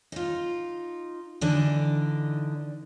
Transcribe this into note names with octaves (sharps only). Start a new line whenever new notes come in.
D#4 F4
D3 E3 D4 D#4